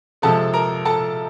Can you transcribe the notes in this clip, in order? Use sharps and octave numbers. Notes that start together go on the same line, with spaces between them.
C3 F3 G#3 A4 A5
A#4 A#5
A4 A5